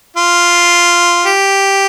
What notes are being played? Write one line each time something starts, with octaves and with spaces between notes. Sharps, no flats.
F4
G4